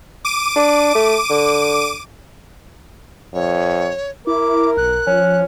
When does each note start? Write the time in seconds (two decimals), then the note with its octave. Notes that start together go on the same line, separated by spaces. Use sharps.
0.25 D6 D#7
0.56 D4
0.95 A3
1.30 D3
3.34 F2 C#5
4.27 E4 A#4 D6
4.77 B1 F#6
5.07 F3 C#4